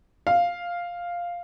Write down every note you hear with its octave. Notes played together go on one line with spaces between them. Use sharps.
F5